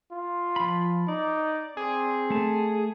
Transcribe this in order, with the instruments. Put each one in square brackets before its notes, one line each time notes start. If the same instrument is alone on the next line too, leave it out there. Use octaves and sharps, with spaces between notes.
[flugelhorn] F4
[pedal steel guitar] F3 B5
[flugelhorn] D#4 [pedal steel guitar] D5
[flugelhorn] C4 [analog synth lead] G#4
[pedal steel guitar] A3 A5